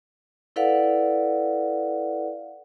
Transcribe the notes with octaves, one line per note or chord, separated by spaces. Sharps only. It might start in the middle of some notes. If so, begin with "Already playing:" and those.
E4 A4 B4 D5 F5 F#5